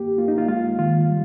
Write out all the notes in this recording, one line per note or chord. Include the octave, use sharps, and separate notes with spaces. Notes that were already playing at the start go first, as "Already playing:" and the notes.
Already playing: A#3 G4
A#3 F4
D#4
F4
G#3 F4
D#3 F4
G3